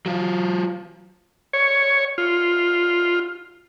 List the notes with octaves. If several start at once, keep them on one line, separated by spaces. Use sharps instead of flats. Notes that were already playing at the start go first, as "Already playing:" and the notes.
F#3 F4
C#5
F4